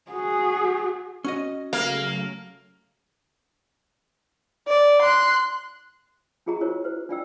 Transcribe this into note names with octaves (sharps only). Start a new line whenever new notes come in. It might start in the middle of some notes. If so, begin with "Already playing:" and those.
F#4 G#4
C#4 F#4 D#5
C#3 F#3 A3 A#3 F5
D5
C6 F#6
C#4 F4 G#4 D#5 A#5 C#6
E4 F#4 A#4 C5 C#5
B4 C5
D4 F4 D5 D#5 G5 E6